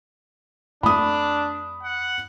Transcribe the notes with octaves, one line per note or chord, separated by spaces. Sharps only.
F2 A3 D4 B5 D#6
F#5